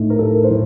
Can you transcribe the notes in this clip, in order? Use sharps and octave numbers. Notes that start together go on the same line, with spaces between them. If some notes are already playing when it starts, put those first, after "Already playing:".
Already playing: A2 A3 D#4
A#4
A4
C5
A2